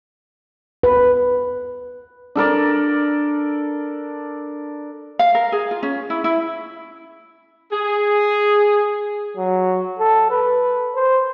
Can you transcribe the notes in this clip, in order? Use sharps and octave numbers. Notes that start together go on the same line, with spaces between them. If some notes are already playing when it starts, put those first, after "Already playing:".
B4
D4 A4 A#4 D5
F5
A#4
G#4
F4
C#4
E4
E4
G#4
F#3
A4
B4
C5